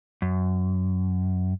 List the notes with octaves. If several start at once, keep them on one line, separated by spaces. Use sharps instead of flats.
F#2